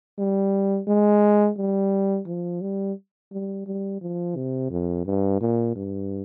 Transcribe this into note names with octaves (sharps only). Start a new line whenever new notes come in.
G3
G#3
G3
F3
G3
G3
G3
F3
C3
F2
G2
A#2
G2